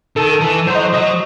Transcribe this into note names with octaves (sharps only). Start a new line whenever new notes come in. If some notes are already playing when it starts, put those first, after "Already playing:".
D#3 A4
E3 A4
F#3 C5
D#5
C5
F#3 D#5